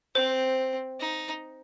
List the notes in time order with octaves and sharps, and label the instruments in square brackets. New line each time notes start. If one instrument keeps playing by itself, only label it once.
[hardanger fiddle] C4 [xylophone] C5
[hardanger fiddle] D#4